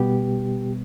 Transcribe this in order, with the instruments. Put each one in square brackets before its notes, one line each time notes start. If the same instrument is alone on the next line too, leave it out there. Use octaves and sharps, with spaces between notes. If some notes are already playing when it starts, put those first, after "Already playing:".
Already playing: [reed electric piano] B2 G3 B3 G4